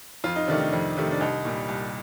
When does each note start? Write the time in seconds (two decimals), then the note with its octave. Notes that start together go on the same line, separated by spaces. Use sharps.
0.24 F2 F4
0.36 D#4
0.47 C3 D#3 A3 D4
0.59 D#4
0.72 F2
0.97 C3 D#3 A3
1.12 D4
1.21 C2 D#4
1.45 A#2 G3
1.68 C2